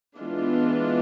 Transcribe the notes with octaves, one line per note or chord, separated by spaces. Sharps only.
E3 G#3 B3 D4 F4